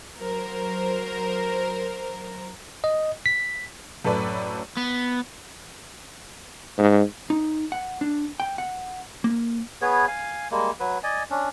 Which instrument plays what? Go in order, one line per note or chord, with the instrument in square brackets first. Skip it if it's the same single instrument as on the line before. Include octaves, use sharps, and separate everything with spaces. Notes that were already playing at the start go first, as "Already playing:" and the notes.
[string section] F#3 A#4 C5
[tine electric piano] D#5
B6
[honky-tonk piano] F#2 A2 A4 B4 D5
[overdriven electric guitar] B3
[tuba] G#2
[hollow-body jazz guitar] D#4
F#5
D4
G5
F#5
A#3
[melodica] B3 G#4 B4 C#5
F5 G#5
G3 G#3 A#3
F#3 B4
D5 D#5 G#5
C#4 D4